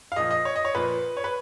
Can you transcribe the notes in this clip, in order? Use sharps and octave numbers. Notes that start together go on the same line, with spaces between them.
F5
A#2 F3 D#5
D#5
C#5
D#5
C#5
A#2 F3 B4
C#5
B4